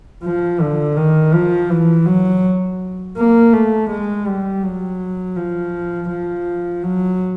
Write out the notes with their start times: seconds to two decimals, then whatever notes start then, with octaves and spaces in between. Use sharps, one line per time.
0.24 F3
0.61 D3
0.97 D#3
1.34 F3
1.70 E3
2.06 F#3
3.17 A#3
3.53 A3
3.91 G#3
4.27 G3
4.64 F#3
5.37 F3
6.10 F3
6.84 F#3